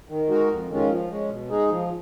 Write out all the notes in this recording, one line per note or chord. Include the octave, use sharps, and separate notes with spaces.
D#3
G#3 D#4 F#4 A#4
F2
D#3 G#3 C#4 F4
F3
G#3 C#4
B2
G#3 D#4 G#4
F3